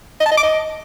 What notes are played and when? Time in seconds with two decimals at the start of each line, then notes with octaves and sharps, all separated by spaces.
0.20 D#5
0.26 A5
0.32 D#5
0.38 D6
0.43 D#5